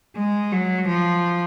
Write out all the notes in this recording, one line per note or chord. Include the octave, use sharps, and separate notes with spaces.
G#3
F#3
F3